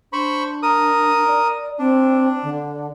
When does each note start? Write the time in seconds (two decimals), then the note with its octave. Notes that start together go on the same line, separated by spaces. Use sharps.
0.13 D4 C5 B5 C#6
0.63 A#4 D#6
1.27 D5
1.79 C4 D4
2.43 D3